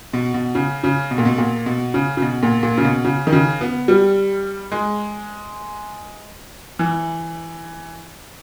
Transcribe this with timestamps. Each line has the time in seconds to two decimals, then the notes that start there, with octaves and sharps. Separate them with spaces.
0.13 B2
0.34 B2
0.55 C#3
0.83 C#3
1.11 B2
1.18 A#2
1.25 B2
1.38 A#2
1.66 B2
1.94 C#3
2.17 C#3
2.22 B2
2.43 A#2
2.63 A#2
2.77 C#3
2.85 B2
3.04 C#3
3.27 D#3
3.32 C#3
3.61 B3
3.88 G3
4.72 G#3
6.79 E3